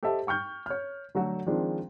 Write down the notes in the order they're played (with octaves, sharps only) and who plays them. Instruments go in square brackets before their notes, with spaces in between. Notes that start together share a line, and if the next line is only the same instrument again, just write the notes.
[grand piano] G4 A4 C5 D#5 E5 A5
G5 C#6 F6 G6
C#5 F6
D3 F#3 A3 F#4
D#3 F3 G#3 C4 D4